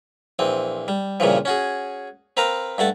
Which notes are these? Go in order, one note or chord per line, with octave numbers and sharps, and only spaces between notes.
A#1 E3 C4
G3
G2 A#2 C#3 E3 F3
C#4 F#4 G#4
C4 A#4 B4 F5 A#5
G2 A3 F#5 A5